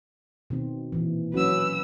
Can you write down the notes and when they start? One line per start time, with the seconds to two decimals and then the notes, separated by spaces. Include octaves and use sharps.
0.50 B2 D#3 C4
0.92 A#2 E3
1.34 F#3 C#4 F#4 B4 E6